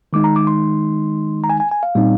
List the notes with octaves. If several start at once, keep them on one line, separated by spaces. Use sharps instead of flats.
D#3 G#3 D#4 D6
A#5
D6
C6
A#5
G#5
G#5
G#5
F5
A#2 G3 C4 D#4